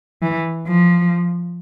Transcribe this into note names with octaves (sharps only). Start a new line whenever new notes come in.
E3
F3